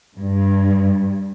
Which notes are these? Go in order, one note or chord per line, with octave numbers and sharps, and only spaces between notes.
G2